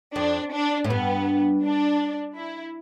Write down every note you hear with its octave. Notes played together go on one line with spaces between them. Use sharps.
F2 D4
D4
A2
G2 B3
D4
E4